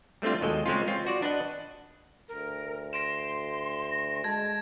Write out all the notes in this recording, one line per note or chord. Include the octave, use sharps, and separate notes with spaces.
G3 A3 C4 D4 F4
D#2 B2 G#3 A4 D#5 G5
C#3 G#3 C4 C#4 F4
C4 F4 C#5
F#4 D5
D4 B4 D#5 F#5
D2 A#4
C6 A#6 D7 E7
A#6
G#3 A5 G#6